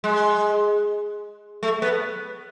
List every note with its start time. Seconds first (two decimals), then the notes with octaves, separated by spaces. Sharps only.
0.04 G#3
1.63 A3
1.82 B3